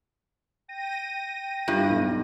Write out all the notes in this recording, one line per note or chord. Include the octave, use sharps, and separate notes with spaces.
G5 A#6 D#7
G2 E4 G4
B1